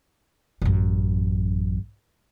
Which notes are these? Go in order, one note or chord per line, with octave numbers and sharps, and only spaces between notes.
A1 F#2